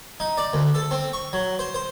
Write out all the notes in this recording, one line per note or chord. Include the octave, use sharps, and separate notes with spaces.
D#4
D5
D2
A4
C4
C#6
F#3
C5
C5